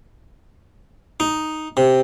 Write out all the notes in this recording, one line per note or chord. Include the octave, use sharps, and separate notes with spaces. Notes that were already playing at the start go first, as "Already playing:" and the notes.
D#4
C3